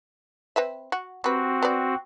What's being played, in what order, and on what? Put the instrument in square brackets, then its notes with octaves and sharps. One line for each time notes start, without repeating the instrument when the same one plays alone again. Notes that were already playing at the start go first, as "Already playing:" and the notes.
[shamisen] C4 B4 E5
F#4
[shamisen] G3 B4 [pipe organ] C4 F#4
[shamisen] B3 D5